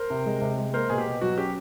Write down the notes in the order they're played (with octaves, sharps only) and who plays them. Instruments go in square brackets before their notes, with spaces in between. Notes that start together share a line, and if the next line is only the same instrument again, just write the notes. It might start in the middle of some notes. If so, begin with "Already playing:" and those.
Already playing: [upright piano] A#4 C5
[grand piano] C3
G#3
C3
G#3
[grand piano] A#3 [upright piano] A#4 C5
[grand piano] B2 [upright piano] G#4
[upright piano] G4
[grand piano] B2
[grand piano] F#3 [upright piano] F#4
[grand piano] C#4 [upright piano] G4